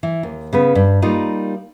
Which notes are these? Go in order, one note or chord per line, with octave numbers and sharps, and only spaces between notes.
E3
D#2
C#3 B3 B4
G2
G3 A#3 D#4 F4